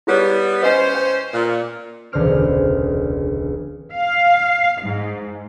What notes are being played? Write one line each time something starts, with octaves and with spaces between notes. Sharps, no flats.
G3 B3 E4 G#4 C#5
C#4 B4 C5 D#5
G5
A#2
E1 C#2 D3 C5 F6 D7
F5
G#2